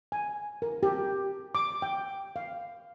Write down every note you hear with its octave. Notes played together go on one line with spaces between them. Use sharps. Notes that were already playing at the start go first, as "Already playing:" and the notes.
G#5
A#4
G4
D6
G5
F5